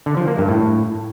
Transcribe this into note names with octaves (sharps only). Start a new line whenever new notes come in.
D3
F3
A#3
G2
A2